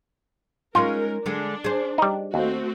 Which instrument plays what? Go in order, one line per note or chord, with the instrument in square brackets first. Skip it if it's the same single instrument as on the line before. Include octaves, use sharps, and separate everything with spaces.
[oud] G#3 C#4 D#4 [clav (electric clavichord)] F4 [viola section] A#4
[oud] D3 G#3 [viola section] D4
[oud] G#4 C5
[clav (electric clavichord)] G3 D#4
[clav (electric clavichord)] D#2 [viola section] A3 C4 F#4